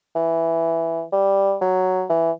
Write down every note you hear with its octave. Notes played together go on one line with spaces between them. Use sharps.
E3
G3
F#3
E3